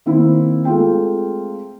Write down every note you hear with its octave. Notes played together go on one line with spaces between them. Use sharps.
D#3 A#3 C4 E4
G#3 A3 C4 F4 G5